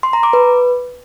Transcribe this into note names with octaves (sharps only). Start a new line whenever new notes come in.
C6
A#5
D6
B4